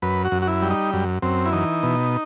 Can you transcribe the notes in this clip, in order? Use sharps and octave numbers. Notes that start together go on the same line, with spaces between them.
F#2 B4
F#4
F#2
F#4
E4
G3
D#4
F#2
F#2 C4
E4
E3 D#4
B2